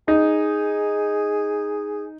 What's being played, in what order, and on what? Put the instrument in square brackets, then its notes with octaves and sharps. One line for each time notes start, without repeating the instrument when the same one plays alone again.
[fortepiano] D#4 [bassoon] G#4